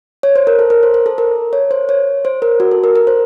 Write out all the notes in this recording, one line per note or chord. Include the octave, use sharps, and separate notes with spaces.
C#5
C5
A#4
A4
A#4
C5
C5
A4
A#4
C#5
C5
C#5
C5
A#4
F#4
A4
A#4
A#4
C5